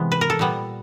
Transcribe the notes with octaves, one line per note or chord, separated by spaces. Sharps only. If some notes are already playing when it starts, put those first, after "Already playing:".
Already playing: C3 E3 G#3 B3
B4
A#4
A4
A#2 G3 B3